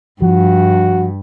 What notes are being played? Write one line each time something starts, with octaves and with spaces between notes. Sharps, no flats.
G2 F3 F#4